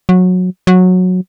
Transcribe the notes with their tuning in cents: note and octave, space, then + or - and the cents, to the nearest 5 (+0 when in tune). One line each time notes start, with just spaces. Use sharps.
F#3 -20
F#3 -15